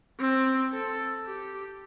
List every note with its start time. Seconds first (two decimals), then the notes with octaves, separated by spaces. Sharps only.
0.19 C4
0.73 A4
1.26 G4